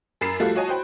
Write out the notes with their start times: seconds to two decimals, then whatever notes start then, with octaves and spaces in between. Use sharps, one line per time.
0.21 F#2 A#4 B5 A6 C7 E7
0.40 F3 G3 A3 F#4 A4 F5
0.55 F4 F#4 C#5 D#5 G#5 A5
0.68 F#4 C5 G5 B5